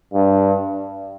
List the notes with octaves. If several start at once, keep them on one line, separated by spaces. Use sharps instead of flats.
G2